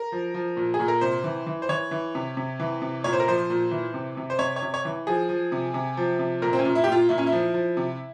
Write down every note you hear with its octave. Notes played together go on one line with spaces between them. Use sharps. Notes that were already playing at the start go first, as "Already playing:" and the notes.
Already playing: A#4
F3
F3
A#2
G#4
A#2
A#4
C3 C5
E3
E3
C5
E3 C#5
E3
C3
C3
E3
C3
A#2 C#5
C5
A#4
F3 C5
A#2
E3
C3
C3
C5
C3 C#5
C#5
C3
C#5
E3
F3 G#4
F3
C3
C3
F3
C3
A#2 A#4
C4
C#4
A#2
E4
G4
A#2 F4
A#2 E4
C#4
E4
F3
F3
C3